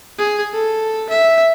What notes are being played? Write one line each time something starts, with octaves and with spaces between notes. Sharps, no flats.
G#4
A4
E5